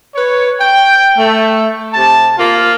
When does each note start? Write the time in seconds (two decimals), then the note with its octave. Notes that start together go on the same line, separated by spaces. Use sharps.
0.15 B4 C#5
0.59 G5
1.17 A3
1.93 C3 A5
2.37 A#3 F4